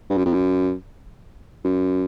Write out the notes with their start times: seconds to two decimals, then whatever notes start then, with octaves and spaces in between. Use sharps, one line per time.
0.10 G2
0.18 F#2
0.26 F2
0.33 F#2
1.65 F#2